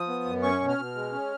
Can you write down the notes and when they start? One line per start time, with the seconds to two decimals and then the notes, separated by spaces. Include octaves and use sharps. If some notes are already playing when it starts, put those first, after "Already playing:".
Already playing: F3 D#6
0.08 B3
0.25 F#2
0.43 C#4 C#6
0.60 B2
0.69 F6
0.78 B2
0.95 G#3
1.12 C#4